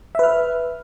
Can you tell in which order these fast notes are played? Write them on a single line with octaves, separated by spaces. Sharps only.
E5 B4 F6